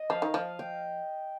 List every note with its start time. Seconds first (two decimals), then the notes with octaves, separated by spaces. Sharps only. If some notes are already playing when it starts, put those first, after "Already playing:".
Already playing: D#5
0.10 F3 F5
0.22 D#3
0.34 F3 F5
0.59 G5